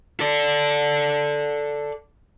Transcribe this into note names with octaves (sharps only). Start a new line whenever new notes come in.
A4 D5